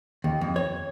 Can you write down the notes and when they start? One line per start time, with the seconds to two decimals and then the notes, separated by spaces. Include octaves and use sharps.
0.24 D#2
0.41 F2
0.56 C#5